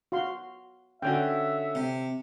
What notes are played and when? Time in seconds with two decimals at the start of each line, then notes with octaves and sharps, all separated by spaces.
0.12 F#4 F5 C6
1.02 D3 C#4 F#4 E5 G5
1.75 C3